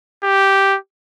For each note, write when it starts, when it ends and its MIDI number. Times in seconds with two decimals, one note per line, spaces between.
0.24 0.77 67